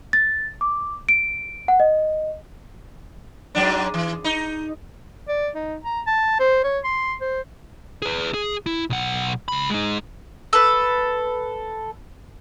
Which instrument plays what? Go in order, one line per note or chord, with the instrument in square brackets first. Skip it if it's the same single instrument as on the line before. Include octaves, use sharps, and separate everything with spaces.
[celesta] A6
D6
D7
F#5
D#5
[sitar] G#2 F#3 D4
E3
D#4
[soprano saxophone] D5
D#4
A#5
A5
C5
C#5
C6
C5
[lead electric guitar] G#4 B4
G#4
E4
B1 F#5
C#2 B5
G#3 D#4
[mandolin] A4 B4